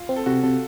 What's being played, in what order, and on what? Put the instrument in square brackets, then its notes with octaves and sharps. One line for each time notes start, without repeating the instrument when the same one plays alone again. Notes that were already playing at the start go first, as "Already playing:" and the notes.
Already playing: [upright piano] F4
[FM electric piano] C4
[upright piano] A4
[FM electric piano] C3 [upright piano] F#4
[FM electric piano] C3 [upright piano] A4